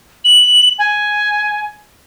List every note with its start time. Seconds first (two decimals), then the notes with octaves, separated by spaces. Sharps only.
0.25 F#7
0.79 G#5